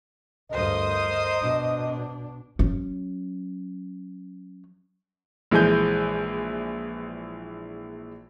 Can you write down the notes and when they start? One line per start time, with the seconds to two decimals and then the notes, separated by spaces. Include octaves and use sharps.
0.51 D2 G2 A#4 C5 D#5 D#6
1.42 B2 D4
2.59 F#3 C#4
5.51 A#1 E3 G#3 G#5 G6